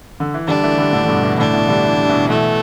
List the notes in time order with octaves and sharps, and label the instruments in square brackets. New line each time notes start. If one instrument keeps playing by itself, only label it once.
[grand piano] D3
E3
[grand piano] D3 G3 [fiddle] D4
[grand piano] E3 A3
D3 G3
A2 D3
D3
G2 B2
B2 E3
[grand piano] A2 D3 [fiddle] D4
[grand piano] B2 E3
D3 G3
E3
G3
B2 E3
[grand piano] B2 E3 [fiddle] A3